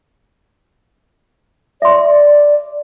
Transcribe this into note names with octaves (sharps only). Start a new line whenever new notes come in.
D5 E5 C6